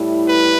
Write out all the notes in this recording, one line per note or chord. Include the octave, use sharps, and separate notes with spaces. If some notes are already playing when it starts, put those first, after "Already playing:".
Already playing: A2 G3 E4
B4